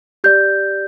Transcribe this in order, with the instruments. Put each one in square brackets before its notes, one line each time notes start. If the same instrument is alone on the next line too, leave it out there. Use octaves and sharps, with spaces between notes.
[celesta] G4 D5 G6